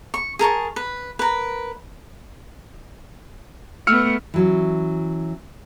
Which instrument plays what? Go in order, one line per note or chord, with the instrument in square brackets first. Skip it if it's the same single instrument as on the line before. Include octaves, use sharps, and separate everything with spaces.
[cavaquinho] C#6
G#4 A#4 A5 C#6
B4
A#4 B4
[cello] A3 B3 [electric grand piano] E6 F6 C#7
[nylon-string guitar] E3 F#3 C#4